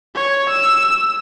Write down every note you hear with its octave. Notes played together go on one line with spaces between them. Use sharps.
C#5
E6